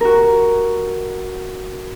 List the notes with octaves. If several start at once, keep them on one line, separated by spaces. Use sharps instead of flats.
F#4 A#4